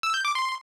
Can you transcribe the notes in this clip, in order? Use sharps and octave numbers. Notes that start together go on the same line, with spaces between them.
E6
G6
D6
C6